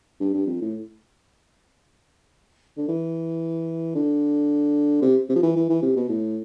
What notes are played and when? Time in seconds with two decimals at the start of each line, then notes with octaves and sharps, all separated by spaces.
0.20 G2
0.34 G2
0.47 F2
0.61 A2
2.77 D3
2.88 E3
3.95 D3
5.02 C3
5.29 C3
5.35 F3
5.43 E3
5.56 E3
5.69 E3
5.82 C3
5.96 B2
6.09 A2